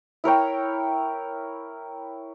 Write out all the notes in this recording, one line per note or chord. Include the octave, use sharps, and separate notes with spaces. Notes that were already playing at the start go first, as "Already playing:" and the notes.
E4 A#4 C#5 G5